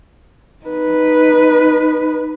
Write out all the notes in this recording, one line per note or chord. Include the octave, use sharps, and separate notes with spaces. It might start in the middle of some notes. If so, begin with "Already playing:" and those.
D#4 B4